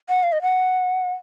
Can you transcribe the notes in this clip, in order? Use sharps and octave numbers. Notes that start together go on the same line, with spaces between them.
F#5
F5
D#5
F#5